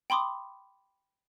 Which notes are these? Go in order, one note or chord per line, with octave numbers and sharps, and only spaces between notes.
G5 B5 C6 D6 D#6